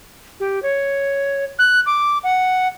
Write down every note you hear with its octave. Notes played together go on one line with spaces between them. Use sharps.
G4
C#5
F#6
D6
F#5